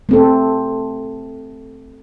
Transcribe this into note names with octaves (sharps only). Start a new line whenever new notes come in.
A3 C4 A4